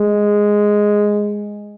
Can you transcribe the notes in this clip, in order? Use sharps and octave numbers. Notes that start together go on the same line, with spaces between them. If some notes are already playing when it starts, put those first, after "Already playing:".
Already playing: G#3